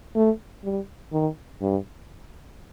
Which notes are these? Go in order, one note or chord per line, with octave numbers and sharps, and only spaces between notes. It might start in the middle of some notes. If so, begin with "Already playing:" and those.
A3
G3
D#3
G2